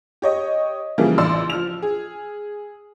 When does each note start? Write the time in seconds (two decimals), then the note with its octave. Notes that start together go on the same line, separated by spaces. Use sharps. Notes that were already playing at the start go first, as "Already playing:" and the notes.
0.22 G4 C#5 D#5
0.98 C#3 E3 F3 G3 A#3
1.18 A1 D5 C6 E6
1.50 F3 F6 F7
1.82 G#4